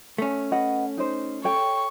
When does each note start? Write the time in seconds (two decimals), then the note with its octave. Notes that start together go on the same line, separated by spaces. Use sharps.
0.18 A3 C#4
0.51 B4 D#5 F#5
0.98 D#4 C5
1.44 A4 C#5 G5 C#6